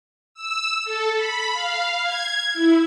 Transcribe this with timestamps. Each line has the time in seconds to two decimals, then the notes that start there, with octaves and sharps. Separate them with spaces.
0.34 E6
0.84 A4
1.15 B5
1.52 F5
2.03 G#6
2.53 E4